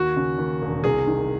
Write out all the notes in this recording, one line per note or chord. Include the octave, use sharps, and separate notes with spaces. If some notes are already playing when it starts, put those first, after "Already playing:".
Already playing: D#2 F#4
C#3
D#2
E1
C2 G#4
D#3